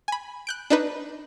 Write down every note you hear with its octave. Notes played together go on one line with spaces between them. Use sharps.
G#5 B5
F#6 G6 D7
D4 D#4 B4